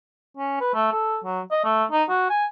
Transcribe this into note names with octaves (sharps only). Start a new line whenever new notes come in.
C#4
B4
A3
A4
F#3
D#5
A3
D#4
F#4
G#5